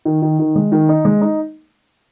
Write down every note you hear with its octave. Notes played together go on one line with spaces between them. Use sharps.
D#3
D#3
D#3
G#3
D#3
D#4
G#3
D#4